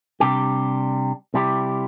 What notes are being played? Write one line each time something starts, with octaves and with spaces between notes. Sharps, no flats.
C3 G3 D4 G4
C3 G3 E4 G4